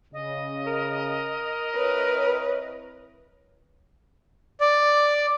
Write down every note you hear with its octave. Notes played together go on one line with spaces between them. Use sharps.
C#3 D#5
A#4
C4 E4 B4 C#5
D5